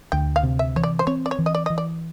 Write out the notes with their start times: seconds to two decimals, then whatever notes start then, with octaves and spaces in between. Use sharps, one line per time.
0.12 D2 G5
0.36 F5
0.43 C3
0.59 E5
0.76 E3 C#5
0.83 D5
0.99 C5
1.07 C4 C#5
1.26 D5
1.31 C#5
1.39 E3
1.46 D#5
1.55 D5
1.66 E3 D#5
1.78 D5